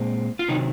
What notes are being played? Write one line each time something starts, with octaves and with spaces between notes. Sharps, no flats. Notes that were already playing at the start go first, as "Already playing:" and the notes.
Already playing: A#2 G#3 C4
F4
C3 D#3 F#3 D#4